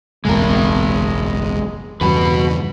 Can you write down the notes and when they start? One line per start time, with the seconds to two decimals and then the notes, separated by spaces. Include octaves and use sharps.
0.25 F#1 B1 E2 G#3 A#4
2.01 E2 G2 C#3 F#4 B4